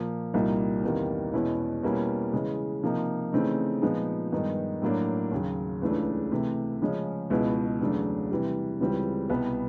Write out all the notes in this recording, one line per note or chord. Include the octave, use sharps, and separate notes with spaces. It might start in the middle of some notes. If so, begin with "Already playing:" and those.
Already playing: A#2 F3 A#3
C2 A#2 G3 A#3 D#4
E2 C3 D#3 G3 A#3
E2 B2 G#3 C#4 E4
B2 G3 A#3 C#4 E4
C#3 E3 G#3
C3 F3 A#3 D#4
C#3 E3 A3 C4 D#4
A#2 F3 G#3 B3 D#4
G2 D#3 G#3 B3 D#4
A2 F#3 A#3 D4
D#2 C#3 F#3
C#2 C#3 E3 A3 D4
C3 E3 A3
C#3 F3 G#3 C#4
C#2 B2 G#3 B3 E4
E2 C#3 F#3 A3 D4
C3 E3 G3
C#2 C#3 E3 G3 C4
C2 B2 G3 B3